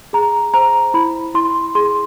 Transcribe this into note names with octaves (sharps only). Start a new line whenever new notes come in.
G#4 A#5
C5 A#5
E4 B5
E4 C6
G#4 C6